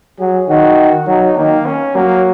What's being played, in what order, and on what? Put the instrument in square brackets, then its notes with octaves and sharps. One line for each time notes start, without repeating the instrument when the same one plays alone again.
[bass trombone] F#3 [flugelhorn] G#4
[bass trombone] D#3 [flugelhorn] F#4
[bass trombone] F#3 [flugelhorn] D#4
[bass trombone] D#3 [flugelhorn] A#3
[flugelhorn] C#4
[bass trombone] F#3 [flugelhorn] A#3